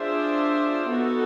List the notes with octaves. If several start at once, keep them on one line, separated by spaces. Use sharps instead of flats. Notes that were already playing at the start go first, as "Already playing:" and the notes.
Already playing: D4 F4 G#4 C5 E5
B3 D#4 F#4 A4